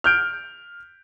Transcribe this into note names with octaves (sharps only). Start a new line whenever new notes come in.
F6 G6 D7